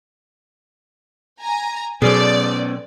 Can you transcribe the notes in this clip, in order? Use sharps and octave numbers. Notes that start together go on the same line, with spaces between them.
G#5 A#5
B2 F#3 B3 C#4 G#4 A4 C5 D5